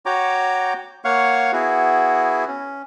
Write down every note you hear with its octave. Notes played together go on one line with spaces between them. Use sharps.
F#4 C#5 G5 A#5 D6
A#3 C#5 F5 F#5 C#6
B3 E4 F#4 G#4
C#4